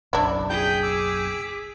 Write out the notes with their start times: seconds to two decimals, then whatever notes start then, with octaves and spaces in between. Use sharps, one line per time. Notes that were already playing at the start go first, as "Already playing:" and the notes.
0.13 F#1 B1 C#3 D4 E4
0.50 G#4 G5 G6 B6
0.83 D6 E6